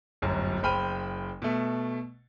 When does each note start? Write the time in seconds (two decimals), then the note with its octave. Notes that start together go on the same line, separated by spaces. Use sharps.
0.22 D1 G1 F#2
0.63 F#1 C5 G5 B5 F6 D#7
1.42 B2 A3